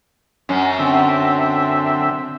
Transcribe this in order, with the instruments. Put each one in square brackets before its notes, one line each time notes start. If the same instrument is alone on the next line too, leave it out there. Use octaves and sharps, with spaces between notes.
[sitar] F#2 C#4
[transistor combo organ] D3 C4 E5